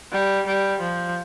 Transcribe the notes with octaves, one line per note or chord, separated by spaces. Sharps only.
G3
G3
F3